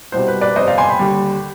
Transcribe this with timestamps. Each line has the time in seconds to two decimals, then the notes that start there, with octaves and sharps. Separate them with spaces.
0.12 C2 B2 G3 C5
0.28 B4
0.41 B4 D5
0.56 G1 F2 C3 C5 D#5
0.67 D5 F5
0.78 G#5 C6
0.89 G5 B5
0.99 D#2 D3 G3